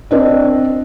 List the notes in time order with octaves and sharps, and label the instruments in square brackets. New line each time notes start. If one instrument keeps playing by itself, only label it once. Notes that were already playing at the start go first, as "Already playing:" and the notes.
[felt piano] C4 D4 D#5